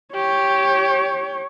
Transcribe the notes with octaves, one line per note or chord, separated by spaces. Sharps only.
G4 C#5